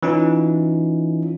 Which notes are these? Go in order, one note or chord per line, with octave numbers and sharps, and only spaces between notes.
E3 C#4 D#4 F4